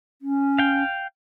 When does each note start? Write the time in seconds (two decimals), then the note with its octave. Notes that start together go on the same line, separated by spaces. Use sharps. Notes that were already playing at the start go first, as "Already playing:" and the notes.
0.22 C#4
0.58 F5 G5